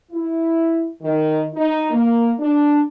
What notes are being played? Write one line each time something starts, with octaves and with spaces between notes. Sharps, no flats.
E4
D#3
D#4
A#3
D4